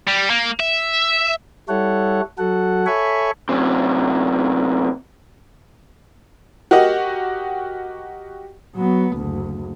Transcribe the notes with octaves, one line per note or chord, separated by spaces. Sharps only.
G3
A#3
E5
G3 E4 A4 C#5 F#5
F#3 F#4 A4 F#5
A4 C#5 E5 G#5 B5 C#6
F#2 C3
F#4 G4 A#4 D#5 F#5
F#3 B3
F#1 D2